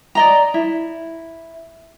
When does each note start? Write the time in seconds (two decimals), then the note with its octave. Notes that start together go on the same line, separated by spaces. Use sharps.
0.15 D5 D#5 A#5
0.54 E4